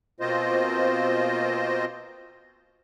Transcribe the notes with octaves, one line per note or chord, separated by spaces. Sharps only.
B2 A#3 C4 F4 C5 D#5